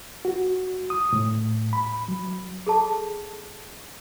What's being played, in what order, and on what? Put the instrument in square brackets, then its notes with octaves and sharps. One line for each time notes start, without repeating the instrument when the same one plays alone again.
[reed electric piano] F#4
D#6
A2
B5
F#3
[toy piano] G#4 A4 A5